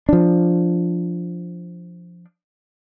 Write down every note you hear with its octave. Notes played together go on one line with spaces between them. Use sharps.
F3 D4